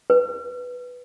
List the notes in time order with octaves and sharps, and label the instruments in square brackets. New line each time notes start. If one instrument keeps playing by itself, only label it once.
[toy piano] B4